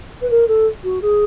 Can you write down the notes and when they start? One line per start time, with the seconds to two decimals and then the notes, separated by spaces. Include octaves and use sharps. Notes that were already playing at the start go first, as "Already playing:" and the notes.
0.21 B4
0.30 A#4
0.47 A4
0.83 F#4
1.01 G#4